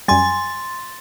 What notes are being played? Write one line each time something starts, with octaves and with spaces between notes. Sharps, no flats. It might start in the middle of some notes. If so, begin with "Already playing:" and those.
F#2 G3 G#5 C6 A6